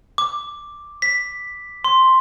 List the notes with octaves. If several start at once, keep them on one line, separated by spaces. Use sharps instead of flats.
D6
B6
C6